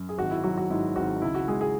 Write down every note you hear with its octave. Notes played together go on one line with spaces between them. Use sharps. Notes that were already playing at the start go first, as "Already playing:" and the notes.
Already playing: F#2
G#4
G#1 F#4
E4
F#3 F#4
F#4
G#2 E4
G#1 F#4
C#2 E4
F#4
G#3 G#4
G#4